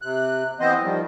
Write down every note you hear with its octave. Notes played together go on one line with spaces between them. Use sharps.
C3 F#6
E3 B3 C4 C5 D#5
D#3 F3 G3